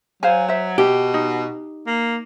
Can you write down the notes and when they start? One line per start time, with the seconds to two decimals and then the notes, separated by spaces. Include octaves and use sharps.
0.23 F#3 C5 F5 G#5
0.48 C5 E5
0.78 B2 G4
1.14 D#4
1.87 A#3